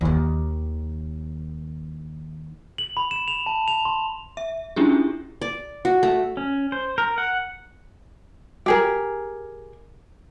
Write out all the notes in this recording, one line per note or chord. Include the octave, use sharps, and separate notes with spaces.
D#2 D#3
F#7
B5
E7
F7
A5
F7
C6
E5
C#4 D4 E4 F4 G4 G#4
D5
F#4
A3
C#4
C5
A#4
F#5
G4 G#4 A#4